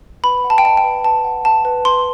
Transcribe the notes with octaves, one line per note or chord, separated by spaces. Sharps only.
B4 B5
F#5
A5
G5
D#5 A5
G5
B4
B4 A5
F#5
F#5 A5
B4
B4 C6